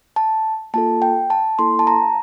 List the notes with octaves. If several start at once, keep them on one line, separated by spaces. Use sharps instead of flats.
A5
A#3 F4 A4 A5
G5
A5
A#3 E4 A4 C6
A5
A#5